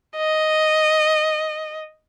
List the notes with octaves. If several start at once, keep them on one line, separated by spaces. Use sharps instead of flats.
D#5